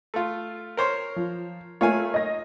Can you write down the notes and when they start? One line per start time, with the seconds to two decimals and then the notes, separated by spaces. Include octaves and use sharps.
0.14 A3 F4
0.77 A#4 C5 C#5
1.16 F3
1.81 A3 A#3 F4 C#5 F5 G#5
2.14 D#5 A#6